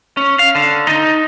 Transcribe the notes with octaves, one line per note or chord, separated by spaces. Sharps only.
C#4
F5
D3
D#4